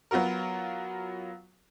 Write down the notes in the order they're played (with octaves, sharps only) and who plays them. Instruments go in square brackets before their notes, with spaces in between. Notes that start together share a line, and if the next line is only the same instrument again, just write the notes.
[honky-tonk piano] F#3 B3 F4 F#4 A#4